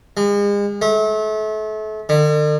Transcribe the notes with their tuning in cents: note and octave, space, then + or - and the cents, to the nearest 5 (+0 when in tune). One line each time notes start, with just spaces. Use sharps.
G#3 -40
A3 -35
D3 +45